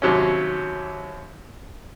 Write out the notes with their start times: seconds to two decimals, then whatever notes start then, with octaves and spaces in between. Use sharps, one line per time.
0.02 D#2 C3 F#3 C#4